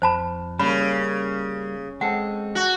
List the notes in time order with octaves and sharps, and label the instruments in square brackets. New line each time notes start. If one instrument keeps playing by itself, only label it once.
[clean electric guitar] F2 [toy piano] C5 A5 B5
[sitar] C#3 [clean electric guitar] G3 A#3 [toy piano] B5
[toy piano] A#4
[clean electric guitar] G#3 C4 A4 [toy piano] F#5
[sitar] F#4